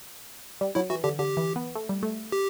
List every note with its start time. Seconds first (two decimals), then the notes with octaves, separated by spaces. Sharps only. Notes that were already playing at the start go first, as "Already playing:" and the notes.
0.61 G3
0.75 F#3 E4
0.90 E3 F#4
1.04 D3 G4
1.18 D3 G4
1.37 E3
1.56 B3
1.75 A3
1.89 G3
2.03 A3
2.32 G4